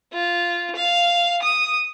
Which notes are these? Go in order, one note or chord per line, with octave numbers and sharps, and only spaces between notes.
F4
F5
D#6